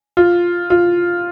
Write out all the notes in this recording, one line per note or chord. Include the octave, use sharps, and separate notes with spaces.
F4
F4